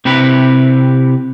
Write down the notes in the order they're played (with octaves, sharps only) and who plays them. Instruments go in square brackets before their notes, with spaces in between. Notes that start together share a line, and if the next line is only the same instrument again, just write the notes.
[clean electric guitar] C3 C4 E4 G4 B4